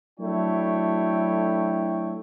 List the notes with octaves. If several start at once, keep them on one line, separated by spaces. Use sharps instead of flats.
F#3 A3 D4 E4 C#5 G5